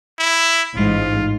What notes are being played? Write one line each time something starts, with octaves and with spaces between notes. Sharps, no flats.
E4
A1 G#2 F4